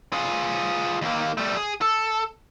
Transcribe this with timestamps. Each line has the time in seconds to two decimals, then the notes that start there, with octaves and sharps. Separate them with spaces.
0.13 F4 G#4
1.02 D#2 A#3
1.38 G3 A3
1.57 G#4
1.81 A4